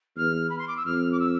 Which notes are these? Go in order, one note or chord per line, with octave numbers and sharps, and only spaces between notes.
E2 F6
B5
C6
D6
E6
F2 F6
D6
E6